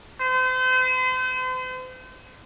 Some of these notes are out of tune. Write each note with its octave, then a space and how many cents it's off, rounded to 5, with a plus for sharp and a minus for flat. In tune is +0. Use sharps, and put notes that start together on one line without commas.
C5 -40